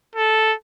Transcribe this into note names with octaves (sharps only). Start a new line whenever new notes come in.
A4